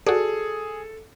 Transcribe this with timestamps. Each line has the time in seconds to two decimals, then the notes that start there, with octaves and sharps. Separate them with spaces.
0.06 F#4 G#4 A4 D5